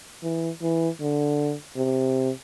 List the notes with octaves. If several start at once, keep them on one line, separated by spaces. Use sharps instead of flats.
E3
E3
D3
C3